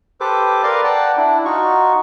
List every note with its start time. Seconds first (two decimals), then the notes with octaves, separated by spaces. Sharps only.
0.21 G4 A4 B4 C5 D6
0.63 A#4 B4 D5 F5 A#5 C6
0.84 D5 F#5 G5 A5
1.17 D4 E4
1.45 D#4 F4 F#4 C#6